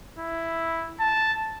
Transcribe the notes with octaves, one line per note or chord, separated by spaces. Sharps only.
E4
A5